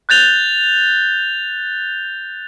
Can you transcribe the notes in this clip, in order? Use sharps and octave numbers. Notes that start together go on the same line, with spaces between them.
F#6 G6 A6 F7 G7